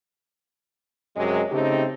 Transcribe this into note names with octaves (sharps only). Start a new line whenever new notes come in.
F#2 C3 F#3 G#3
C#3 A3 C4 D#4 G4